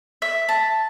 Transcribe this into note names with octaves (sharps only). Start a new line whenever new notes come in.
E5
A5